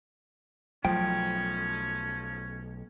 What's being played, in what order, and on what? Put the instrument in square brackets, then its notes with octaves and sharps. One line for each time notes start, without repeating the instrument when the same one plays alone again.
[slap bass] B1 F#3 A3 [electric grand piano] F3 [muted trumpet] C#4 [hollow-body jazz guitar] G5